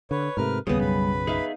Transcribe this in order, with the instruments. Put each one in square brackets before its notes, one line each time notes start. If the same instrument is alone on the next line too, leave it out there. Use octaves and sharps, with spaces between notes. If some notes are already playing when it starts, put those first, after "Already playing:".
[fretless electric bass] D3 [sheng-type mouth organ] B4 C#5
[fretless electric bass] G#2 C3 A3 [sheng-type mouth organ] A#4 B4 F6
[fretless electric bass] E1 A1 D#2 [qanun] C#3 B3 [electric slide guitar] G3 [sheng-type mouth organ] D#6
[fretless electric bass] B1 F#2 [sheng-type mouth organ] B4 B5
[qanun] D#4 F5 [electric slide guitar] G#4 E5